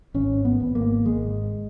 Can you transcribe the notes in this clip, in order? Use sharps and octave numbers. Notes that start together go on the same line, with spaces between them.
G#1 C#4
B3
G#1
A#3
G#1 G#3